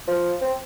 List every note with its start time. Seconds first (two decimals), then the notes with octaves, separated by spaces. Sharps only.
0.08 F3
0.41 C4